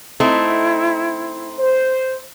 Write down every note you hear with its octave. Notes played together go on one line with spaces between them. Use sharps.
A3 C4 D#4 E4
C5